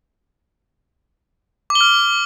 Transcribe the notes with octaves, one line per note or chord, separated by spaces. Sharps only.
D6
G7
F6